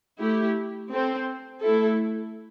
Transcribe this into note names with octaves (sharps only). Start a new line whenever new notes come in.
A3 E4 G4
C4 A4 C5
A3 E4 A4